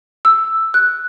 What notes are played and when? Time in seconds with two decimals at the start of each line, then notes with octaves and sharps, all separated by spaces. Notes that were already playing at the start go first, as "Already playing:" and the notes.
0.25 E6
0.74 F#6